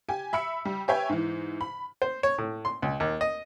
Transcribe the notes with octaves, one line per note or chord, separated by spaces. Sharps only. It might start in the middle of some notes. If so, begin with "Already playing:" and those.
G4 G#5
E5 B5 E6 C#7
G3
G4 B4 C#5 E5 G5 G#5
G#2 E3
B5
C5
C#5
A2
C6
C#2
D#2
D#5